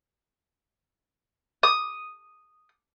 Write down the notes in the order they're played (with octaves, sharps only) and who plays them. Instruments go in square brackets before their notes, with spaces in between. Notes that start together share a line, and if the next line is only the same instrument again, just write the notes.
[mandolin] D#6